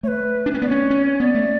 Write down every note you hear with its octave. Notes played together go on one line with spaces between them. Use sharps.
A3 B4 C#5
D4
C#4
B3 D5
C#4 C#5
C#4
B3 D5
A3